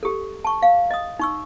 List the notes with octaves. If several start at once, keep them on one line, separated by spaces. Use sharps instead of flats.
G4 A4
A5 C#6
F5
D#5 D#6
D#4 C#6 E6